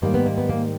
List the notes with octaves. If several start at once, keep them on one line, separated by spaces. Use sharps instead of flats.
G#2 D#3 G3 A#3
B3
A#3
B3
A#3